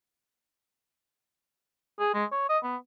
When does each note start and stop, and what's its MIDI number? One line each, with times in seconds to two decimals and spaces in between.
2.00 2.10 68
2.14 2.25 56
2.32 2.46 73
2.49 2.58 75
2.64 2.76 59